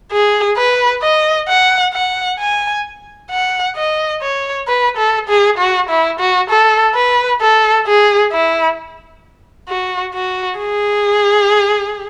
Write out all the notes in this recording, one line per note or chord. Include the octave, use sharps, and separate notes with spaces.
G#4
B4
D#5
F#5
F#5
G#5
F#5
D#5
C#5
B4
A4
G#4
F#4
E4
F#4
A4
B4
A4
G#4
E4
F#4
F#4
G#4